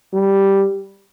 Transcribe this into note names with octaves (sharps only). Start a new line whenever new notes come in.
G3